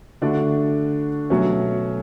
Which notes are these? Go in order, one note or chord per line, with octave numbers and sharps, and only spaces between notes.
D3 A3 D4 F#4
B2 F#3 A3 C#4